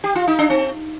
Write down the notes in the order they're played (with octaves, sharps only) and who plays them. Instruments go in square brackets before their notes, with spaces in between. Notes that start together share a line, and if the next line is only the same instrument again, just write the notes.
[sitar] G4
F4
D#4
D4
C4